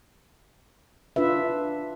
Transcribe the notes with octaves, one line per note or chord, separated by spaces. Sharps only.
D4 F4 B4 E5